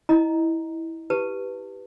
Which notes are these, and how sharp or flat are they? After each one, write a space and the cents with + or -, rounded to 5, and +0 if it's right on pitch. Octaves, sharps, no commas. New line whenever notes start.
E4 -15 D#5 +0 A#5 +0
G4 +0 B4 +0 A5 +25